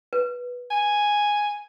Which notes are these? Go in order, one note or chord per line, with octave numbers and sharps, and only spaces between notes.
B4
G#5